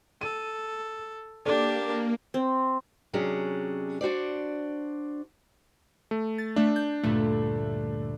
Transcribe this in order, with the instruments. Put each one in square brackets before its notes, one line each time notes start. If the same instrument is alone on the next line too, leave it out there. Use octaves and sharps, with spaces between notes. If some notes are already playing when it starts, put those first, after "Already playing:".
[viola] A4 [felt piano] D#7
[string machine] A#3 [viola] D4 G4 [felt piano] A4 D5
[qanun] C4
[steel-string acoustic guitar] C3 F#3 C#4 D4 G#4
D4 F#4 C5 D5
[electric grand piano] A3
[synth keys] A6
[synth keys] A3 E5 [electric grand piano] D4
[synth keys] G6
[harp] D2 G2 A#2 [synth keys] A3